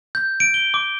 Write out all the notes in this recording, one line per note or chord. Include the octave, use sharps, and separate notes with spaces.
G6
D7
G7
D6